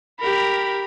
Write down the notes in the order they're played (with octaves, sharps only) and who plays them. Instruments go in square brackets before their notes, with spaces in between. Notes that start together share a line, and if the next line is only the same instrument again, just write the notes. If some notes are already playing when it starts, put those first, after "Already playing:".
[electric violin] G4 A#4 [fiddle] B5